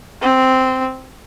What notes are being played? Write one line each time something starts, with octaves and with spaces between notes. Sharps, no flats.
C4